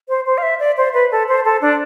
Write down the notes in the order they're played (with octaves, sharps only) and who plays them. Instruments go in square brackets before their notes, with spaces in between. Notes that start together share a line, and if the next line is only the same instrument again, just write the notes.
[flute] C5
C5
F5
E5
D5
C5
B4
A4
C5
A4
D4